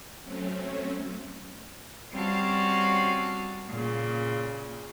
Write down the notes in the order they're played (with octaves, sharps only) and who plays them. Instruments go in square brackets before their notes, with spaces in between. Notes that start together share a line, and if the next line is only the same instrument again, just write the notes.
[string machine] F#3 A3 C4 C#4
[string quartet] G3 C4 C#4 F#4 F5 A5
A#2 C#3